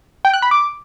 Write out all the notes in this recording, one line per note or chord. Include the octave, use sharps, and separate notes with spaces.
G5
F#6
B5
D6